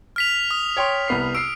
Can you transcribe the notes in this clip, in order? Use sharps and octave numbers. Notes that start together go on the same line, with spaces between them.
F6 B6 F7
D#6
C#5 G5 C6
C2 B3 C7
E6 C7 D7